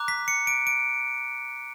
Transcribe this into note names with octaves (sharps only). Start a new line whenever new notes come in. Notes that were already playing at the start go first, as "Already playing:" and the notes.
Already playing: A#5 D6 F#6
B6
C#7
D7
D7